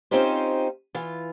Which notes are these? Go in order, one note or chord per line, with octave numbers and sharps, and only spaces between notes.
C4 C#4 D#4 F4 G4 C5
E3 F4